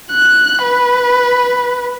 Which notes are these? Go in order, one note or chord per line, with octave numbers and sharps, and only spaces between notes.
F#6
B4